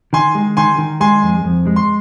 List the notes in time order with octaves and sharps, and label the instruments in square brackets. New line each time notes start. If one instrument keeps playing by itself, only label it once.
[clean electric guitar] D#3 [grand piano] G#5 C6
[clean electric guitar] G#3
[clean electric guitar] D#3 [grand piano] G#5 C6
[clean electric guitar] D#3
[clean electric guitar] G#3 [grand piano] G#5 C6
[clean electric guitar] F2
F2
G#3
[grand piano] C6